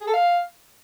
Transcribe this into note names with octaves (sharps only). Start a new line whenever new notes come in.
G#4
A4
F5